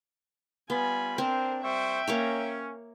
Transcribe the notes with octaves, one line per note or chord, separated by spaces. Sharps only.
G3 B3 F4 G#5 B5
C4 D4 A#4 C5
G3 C5 E5 G5 C#6
A#3 C#4 C#5 A#5